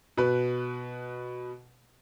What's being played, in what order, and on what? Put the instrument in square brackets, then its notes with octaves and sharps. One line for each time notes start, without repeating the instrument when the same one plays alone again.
[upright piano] B2 B4